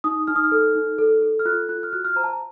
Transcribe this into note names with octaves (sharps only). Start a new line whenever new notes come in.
D#4 D#6
D#4 F6
D#6
F6
A4
D#4
A4
A4
F6
F4 F#6
F4 F#6
F6
F#4 F#6
F6
C5 A#5
A5
A#5